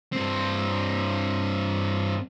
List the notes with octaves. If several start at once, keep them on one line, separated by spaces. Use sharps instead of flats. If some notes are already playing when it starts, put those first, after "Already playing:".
G2 C4